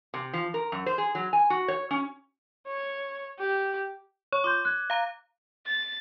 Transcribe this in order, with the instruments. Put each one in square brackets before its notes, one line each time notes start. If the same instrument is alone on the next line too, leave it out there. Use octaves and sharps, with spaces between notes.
[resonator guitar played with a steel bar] C3
F3
A#4
F#2
C5
G#4
F#3
G#5
F#4
C#5
C#4
[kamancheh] C#5
G4
[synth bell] C#5 [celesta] C#6
[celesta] F4 C6 G6 [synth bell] D6
[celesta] F#6 G#6
[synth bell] F5 A#5
[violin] A6